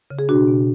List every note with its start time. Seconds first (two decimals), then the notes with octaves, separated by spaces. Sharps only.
0.10 C#3
0.19 G#4
0.29 B2 D4 F#4
0.48 B2